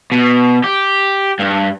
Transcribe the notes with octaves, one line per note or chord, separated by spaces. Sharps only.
B2
G4
G2